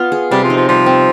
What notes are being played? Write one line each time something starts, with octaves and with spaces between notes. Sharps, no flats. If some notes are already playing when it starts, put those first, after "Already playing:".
Already playing: B3 F4
G#4
C3 G3
F3
D#4
F3
F3 G3
C4